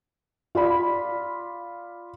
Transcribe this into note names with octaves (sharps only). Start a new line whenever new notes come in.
F4 D5 B5